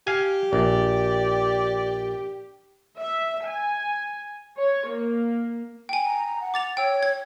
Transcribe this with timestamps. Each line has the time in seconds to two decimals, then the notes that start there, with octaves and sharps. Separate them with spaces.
0.07 G4 F5 G#5
0.53 A#1 D5
3.00 E5
3.47 G#5
4.57 C#5
4.88 A#3
5.89 G5 G#5
6.06 A#5
6.40 F#5
6.54 D6 A6 F7
6.77 C#5 G5 E6
7.03 G#6